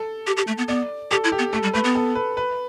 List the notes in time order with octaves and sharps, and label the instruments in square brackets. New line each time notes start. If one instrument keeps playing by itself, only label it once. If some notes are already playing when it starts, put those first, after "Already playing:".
Already playing: [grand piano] A4
[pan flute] G4
G4
A3
B3
[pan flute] B3 [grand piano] D5
[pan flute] G4 [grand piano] A4
[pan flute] E4
[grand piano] G4
[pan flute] B3
[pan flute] A3 [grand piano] A4
[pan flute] G3
[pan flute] A3 [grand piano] B4
[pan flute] B3
[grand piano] A4
B4
B4